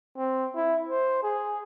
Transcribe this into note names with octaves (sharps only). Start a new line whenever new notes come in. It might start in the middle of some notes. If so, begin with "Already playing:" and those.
C4
E4
C5
G#4